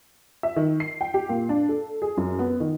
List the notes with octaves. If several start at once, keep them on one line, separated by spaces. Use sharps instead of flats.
E5
D#3
C7
G5
G4
A#2
D4
A4
G#4
F#2
B3
D#3